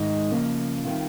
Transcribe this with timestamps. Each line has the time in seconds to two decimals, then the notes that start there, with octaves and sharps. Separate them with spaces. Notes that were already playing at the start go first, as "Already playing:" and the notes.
Already playing: G#2 D#3 G#3 D#4 D#5
0.31 C#3 F3 A#3 C#4
0.84 D#3 G3 C4 F4